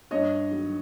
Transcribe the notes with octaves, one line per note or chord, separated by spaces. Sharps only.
G2 C#5 D#5
D#3 F#3